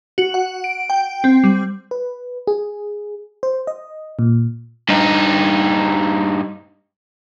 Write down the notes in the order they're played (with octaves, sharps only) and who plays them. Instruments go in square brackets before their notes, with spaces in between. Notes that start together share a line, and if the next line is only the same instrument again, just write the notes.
[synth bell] F#4
F#5
D7
G5
C4
G3
[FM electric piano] B4
G#4
C5
D#5
A#2
[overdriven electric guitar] G2 D#4